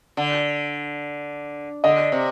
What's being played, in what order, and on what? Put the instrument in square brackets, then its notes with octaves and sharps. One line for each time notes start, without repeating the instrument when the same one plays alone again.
[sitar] D3
[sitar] D3 [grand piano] D#5
[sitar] C3